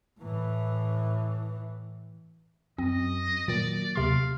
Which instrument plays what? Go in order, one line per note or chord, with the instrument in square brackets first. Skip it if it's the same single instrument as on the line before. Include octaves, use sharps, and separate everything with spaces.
[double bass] A2 E3
[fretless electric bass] F#2 [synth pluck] C4 [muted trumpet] D#5
[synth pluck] A#2 D#3 [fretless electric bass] F#3 A#3 [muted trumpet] D5
[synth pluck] D#2 C3 C6 [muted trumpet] F5